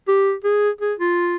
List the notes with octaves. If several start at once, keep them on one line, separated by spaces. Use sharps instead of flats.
G4
G#4
G#4
F4